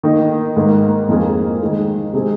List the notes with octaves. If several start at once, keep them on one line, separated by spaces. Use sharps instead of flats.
D#3 A#3 D#4
G#2 D#3 A#3
F2 F3 A#3 F4 G#4
D#3 G#3 D#4 G#4
C3 G#3 C4 G#4